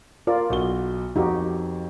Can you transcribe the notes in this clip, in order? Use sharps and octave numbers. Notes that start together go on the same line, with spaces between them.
F4 A#4 D5
B1 F#4 G7
F2 D#4 F#4 G4